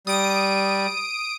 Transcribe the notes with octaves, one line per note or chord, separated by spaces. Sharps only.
G3 D#6 D7